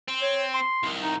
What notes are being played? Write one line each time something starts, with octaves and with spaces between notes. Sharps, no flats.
C4
C#5
C6
C2 D#3
D#4